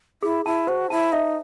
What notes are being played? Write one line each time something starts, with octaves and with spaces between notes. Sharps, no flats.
E4 G#4
E4 A5
F#4 C5
E4 A5
D#4 E5